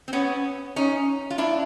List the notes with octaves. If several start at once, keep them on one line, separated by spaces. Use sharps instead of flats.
C4
B3 C#4
C#4 D#4
F4
D4 E4